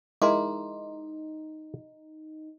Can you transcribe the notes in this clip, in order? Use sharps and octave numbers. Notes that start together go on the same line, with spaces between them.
G#3 D#4 E4 A#4 A#5 C6 D6